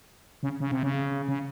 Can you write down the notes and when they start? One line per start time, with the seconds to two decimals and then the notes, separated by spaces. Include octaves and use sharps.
0.43 C#3
0.60 C#3
0.71 C3
0.83 C#3
1.28 C#3